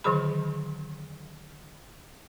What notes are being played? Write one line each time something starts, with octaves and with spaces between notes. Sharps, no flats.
D3 D#3 F#3 G#4 B5